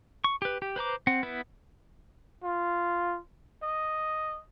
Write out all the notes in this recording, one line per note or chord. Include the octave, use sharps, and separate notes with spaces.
C#6
G4 B4
G4
B4 C5 A#5 D6
C4 F#5
B3 E4 B4
F4
D#5